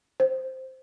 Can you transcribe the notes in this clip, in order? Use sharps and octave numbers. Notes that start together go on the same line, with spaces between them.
C5